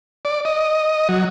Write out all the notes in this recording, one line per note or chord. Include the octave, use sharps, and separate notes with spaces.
D5
D#5
F#3